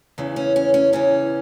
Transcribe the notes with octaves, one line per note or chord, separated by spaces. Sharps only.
E2 C#3 E3
C#4
C#4
C#4
E2 C#3 E3 C#4